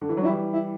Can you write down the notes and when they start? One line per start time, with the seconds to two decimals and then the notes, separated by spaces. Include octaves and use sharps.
0.01 D3
0.09 E3
0.17 F#3
0.22 D4
0.25 E3 G3 E4
0.53 E4